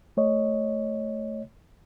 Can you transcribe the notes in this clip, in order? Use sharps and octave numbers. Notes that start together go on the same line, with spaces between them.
A3 C#5 D#5